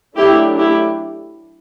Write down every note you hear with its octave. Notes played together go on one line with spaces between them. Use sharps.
F#3 A3 D4 E4 G4
E4 G4